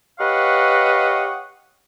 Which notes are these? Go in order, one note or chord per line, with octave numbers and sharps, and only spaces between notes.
G4 B4 C#5 D#5 F5 F#5